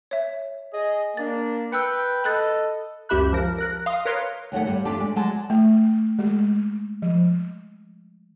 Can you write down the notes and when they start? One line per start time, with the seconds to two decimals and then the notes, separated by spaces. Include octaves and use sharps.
0.11 C#5 E5
0.74 G#4 D#5
1.17 A#3 D4 A6
1.72 B4 G5 E6 F#6 C#7
2.24 A4 D#5 B5 F#6 A6
3.09 C#2 F#2 G4 E5 B5 F#6
3.33 F3 A#4
3.58 A#4 F#6 A#6
3.86 F5 C6 D#6
4.05 A#4 B4 C#5 F5 C6
4.52 D#2 F#3 A3 F#5
4.66 G2 G3
4.85 F2 A3 D4 F4 G4 A5
5.00 G#3
5.16 F#3 G#3 A5
5.50 A3
6.19 G#3
7.02 F3